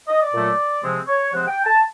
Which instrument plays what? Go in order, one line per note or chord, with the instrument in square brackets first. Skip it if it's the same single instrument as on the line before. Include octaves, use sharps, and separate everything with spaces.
[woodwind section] D#5
D5
A#2 F#3 A3
C3 F3 G#3 C4
C#5
C3 F3 G#3 C4 F#5
G5
A5